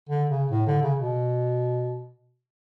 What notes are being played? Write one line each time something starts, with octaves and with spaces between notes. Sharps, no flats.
D3
C#3
A2
D3
C#3
B2